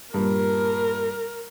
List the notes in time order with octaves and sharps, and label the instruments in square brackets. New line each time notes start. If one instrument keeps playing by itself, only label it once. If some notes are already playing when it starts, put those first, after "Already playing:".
[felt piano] G2 A#2 [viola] A#4